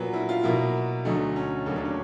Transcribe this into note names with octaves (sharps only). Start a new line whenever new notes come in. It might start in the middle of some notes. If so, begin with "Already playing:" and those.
Already playing: A#2 F#3 B3
E4
F4
B2 F#3 A#3 E4
D2 D3 F#3 A3 D#4
C#4
D#2 C#3 F#3 A3 C#4
D4
C#4